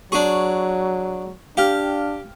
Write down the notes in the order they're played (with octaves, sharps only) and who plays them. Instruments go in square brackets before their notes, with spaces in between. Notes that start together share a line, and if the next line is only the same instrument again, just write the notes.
[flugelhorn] F#3 [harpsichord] D4 G#4 [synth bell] C#6
[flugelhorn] D4 [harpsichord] G4 [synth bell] F5 G5 F6